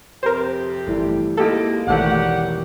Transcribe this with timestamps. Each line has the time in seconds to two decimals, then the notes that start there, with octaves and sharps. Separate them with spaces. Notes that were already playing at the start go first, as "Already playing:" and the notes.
0.23 F2 C3 G4 A#4 C5
0.87 G1 E3 G3 A3
1.37 C3 G#3 A#3 D#4 E4 G4 A4 D7
1.87 E1 A1 D#3 F#3 G3 A3 G4 F#5